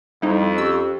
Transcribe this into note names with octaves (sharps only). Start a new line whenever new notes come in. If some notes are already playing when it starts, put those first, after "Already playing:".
F2 G3 D#4 E4
C#4 G4 C#6 E6